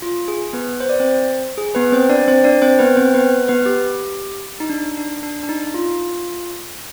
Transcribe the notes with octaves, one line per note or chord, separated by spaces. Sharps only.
F4
G#4
B3 B4
C5
D5
C4 C5
G#4
B3 B4
C4 C5
D4 D5
C4 C5
D4 D5
C4 C5
B3 B4
C4 C5
B3 B4
B3 B4
G4
D#4
D4
D4
D4
D4
D#4
F4